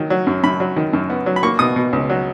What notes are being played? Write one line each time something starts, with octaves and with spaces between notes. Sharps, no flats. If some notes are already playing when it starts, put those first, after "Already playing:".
Already playing: D#3 F#3
F#3
F#2
F#2 B5
F#3
D#3
F#2
B3
F#3
B5
A#3 C#6
B2 D#6
B2
C#2
F#3